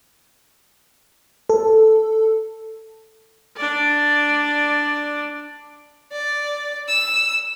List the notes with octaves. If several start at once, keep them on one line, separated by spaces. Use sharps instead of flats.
A4
D4 D5
D5
E6